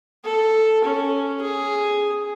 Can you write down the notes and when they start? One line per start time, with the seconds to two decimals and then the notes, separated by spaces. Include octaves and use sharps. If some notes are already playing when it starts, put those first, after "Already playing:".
0.24 A4
0.84 C#4
1.42 G#4